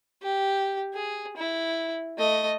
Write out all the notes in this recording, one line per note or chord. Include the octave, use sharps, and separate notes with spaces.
G4
G#4
E4
A3 D#5